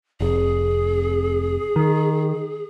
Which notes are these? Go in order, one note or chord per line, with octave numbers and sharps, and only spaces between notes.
F1 G#4
D#3